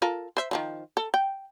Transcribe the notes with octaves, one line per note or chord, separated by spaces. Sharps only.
F4 A4 A#4
C5 E5
D#3 F3 F#3
A4
G5